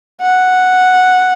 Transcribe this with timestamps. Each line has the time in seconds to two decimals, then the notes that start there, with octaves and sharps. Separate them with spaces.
0.22 F#5